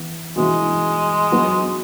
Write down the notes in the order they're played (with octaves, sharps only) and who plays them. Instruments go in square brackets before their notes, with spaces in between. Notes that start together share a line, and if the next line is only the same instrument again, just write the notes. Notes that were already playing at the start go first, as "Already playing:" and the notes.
Already playing: [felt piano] E3 B3
[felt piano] E3 B3 F#4 [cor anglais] G#3
[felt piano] F#3 B3 F#4